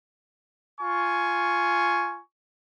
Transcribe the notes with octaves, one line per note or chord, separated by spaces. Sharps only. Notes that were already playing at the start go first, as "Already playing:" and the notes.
F4 G#5 C#6